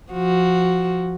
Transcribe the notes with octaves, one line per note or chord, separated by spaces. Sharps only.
F3 F#4